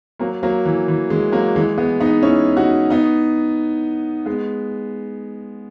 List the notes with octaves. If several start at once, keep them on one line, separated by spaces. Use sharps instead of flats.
F#3 A#3
F#3 A#3
E3
E3
E3 G#3
F#3 A#3
E3 G#3
G#3 B3
B3 D#4
C#4 E4
D#4 F#4
B3 D#4
G#3 B3